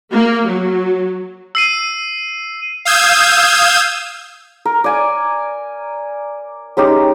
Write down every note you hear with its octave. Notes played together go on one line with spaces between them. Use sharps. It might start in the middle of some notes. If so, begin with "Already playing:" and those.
A#3
F#3
E6 C7 D#7
F5 D#6 E6 G6 G#6
A#4
D5 G#5 D6
G#3 C#4 D#4 G4